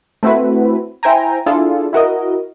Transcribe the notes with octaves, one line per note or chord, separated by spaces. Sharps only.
A3 C4 E4 F#4 B4
E4 C5 G5 G#5 A#5
D4 E4 F4 G#4 A4
E4 F#4 A#4 D#5